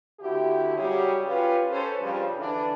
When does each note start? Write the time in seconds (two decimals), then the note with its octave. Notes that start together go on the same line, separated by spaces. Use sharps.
0.20 D2 D3 E4 F#4 G4
0.76 C#3 F#3 G3 F#4 G4
1.26 C#4 F4 G4 B4
1.70 C#4 A4 B4 C5
1.99 G2 C#3 F3 G3
2.38 D3 E3 D4